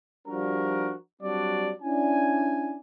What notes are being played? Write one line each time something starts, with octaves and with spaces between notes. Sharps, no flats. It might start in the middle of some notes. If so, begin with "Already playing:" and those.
F3 G3 D4 F#4 A#4
F#3 G3 C4 D4 F#4 D5
C#4 D4 E4 D5 G#5